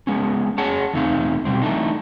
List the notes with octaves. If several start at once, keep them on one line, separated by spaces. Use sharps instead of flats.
G#3 B3 C#4
G#4 C#5 F#5 A5
E2 A3 C4 D#4 F5
B2 G3 C4
E3 A3 D4 D#4